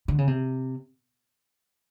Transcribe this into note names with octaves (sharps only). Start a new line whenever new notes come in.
D3
C#3
C3